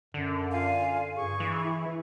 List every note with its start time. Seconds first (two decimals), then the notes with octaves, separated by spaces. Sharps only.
0.14 F#2 D3
0.52 F4 F5 G#5
1.16 G2 G#4 C#6
1.40 E3
1.64 E4